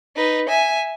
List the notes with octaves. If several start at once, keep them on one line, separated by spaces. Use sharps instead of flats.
D#4 B4
E5 G#5